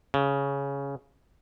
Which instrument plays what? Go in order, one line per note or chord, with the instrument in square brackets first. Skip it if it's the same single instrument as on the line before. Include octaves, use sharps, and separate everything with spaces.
[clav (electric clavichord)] C#3